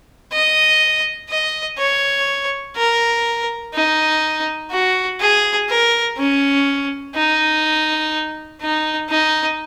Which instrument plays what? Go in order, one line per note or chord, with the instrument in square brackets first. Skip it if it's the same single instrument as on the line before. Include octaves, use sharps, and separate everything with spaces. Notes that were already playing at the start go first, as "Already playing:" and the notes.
[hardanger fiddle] D#5
D#5
C#5
A#4
D#4
F#4
G#4
A#4
C#4
D#4
D#4
D#4